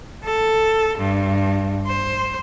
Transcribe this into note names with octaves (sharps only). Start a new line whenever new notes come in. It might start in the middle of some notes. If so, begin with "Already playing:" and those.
A4
G2
C5